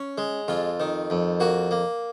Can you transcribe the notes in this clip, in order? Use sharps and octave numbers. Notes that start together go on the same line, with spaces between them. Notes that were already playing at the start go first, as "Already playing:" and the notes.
Already playing: C#4
G#3
F2 F4
D#3
F2
A#3 F#4
A#3